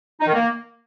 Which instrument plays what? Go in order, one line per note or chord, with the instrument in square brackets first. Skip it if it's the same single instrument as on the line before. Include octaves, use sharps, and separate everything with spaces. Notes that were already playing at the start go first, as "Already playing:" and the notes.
[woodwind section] D#4
D#3
A#3